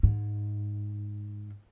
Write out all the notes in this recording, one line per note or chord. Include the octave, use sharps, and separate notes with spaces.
G#2